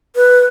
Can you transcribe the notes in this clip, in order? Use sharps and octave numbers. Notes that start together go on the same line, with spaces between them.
B4